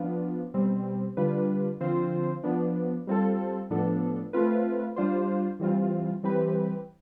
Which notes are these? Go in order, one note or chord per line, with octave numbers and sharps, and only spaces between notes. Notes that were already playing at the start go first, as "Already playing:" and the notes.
Already playing: F3 B3 D4 F4
B2 G3 C4
D3 G3 D4 F4 B4
D3 F3 C4 F4 C5
F3 B3 D4
G3 C4 F4 A4
A2 F3 B3 D4 A4
A3 C4 F4 B4
G3 D4 F4 C5
E3 G3 C4 F4
E3 G3 C4 G4 B4